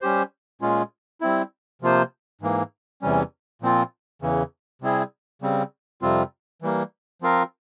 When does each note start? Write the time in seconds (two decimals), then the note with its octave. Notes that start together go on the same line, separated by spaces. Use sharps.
0.01 G3 C#4 G4 C5
0.61 A#2 G#3 C#4 F4
1.21 G3 C4 E4
1.82 C3 F3 A#3 F4 C5
2.41 G#2 E3 A#3
3.02 E2 C3 E3 G3 C#4
3.62 A#2 F3 C4 F4
4.22 E2 C#3 E3
4.82 C3 G3 C4 E4 G#4
5.42 C#3 G3 C4
6.02 F2 C3 G3 C4 F4
6.62 E3 G3 A#3
7.22 F3 C4 F4 A#4 F5